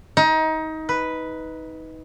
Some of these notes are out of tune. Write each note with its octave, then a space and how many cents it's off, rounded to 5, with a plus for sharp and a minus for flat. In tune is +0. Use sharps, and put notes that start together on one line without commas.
D#4 +25
B4 +0